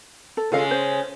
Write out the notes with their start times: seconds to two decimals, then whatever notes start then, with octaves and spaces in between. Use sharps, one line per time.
0.37 A4
0.52 C#3 G#3 F4 A4 F5
0.71 C5